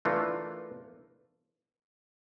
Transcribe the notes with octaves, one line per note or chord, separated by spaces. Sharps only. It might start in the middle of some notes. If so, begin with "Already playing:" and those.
E3 A3 D4 F4 A#4